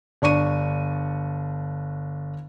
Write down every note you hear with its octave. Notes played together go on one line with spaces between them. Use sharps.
G1 D4 C#6 D#7